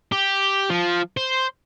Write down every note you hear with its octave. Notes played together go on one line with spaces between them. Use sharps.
G4
F3
C5